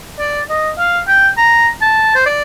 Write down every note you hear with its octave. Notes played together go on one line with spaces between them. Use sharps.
D5
D#5
F5
G5
A#5
A5
C5
D5